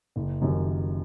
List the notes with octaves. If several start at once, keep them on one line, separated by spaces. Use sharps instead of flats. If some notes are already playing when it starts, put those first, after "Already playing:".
F#1
F#2 D#3 G3